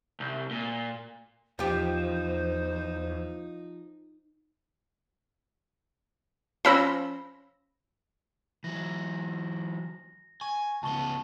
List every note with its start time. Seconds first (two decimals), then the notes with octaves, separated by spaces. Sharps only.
0.20 C2
0.51 A#2
1.59 E2 F3 D#4 G4 C5
6.65 F3 C#4 C5 B5 E6 A#6
8.64 E3 F#3 A#6
10.41 G#5 C#6
10.83 C#2 B3 A5 C#6 G7